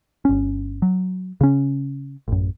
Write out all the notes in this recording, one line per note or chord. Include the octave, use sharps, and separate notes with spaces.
G1 C#4
F#3
C#3 C#4
A1 F#2